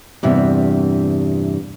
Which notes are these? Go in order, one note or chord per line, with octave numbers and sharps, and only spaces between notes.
E2 G2 C3 E5